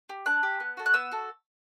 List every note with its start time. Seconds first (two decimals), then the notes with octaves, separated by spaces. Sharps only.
0.09 G4
0.26 D4 F#6
0.43 G4
0.60 B3
0.77 F#4 A4
0.86 F#6
0.94 B3 E6
1.12 F#4 A4